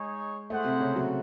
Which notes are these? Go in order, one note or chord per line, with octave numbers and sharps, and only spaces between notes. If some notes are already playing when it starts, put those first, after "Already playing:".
Already playing: G#3 D#4 G#4 C#5
A3 E4 G#4 C5 F#5
C3 C4
C#3 C#4
F#3 F#4